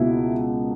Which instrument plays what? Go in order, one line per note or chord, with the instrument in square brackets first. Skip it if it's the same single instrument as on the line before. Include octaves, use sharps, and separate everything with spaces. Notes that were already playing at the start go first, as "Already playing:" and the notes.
Already playing: [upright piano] C#2 B2 A#3 E4